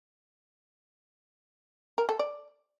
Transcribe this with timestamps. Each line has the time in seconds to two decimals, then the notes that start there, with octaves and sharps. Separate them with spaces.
1.98 A#4
2.09 A4
2.19 D5